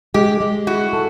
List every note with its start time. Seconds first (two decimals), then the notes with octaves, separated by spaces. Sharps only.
0.14 G#3 G4
0.41 G#3
0.67 E4 F#4
0.93 A4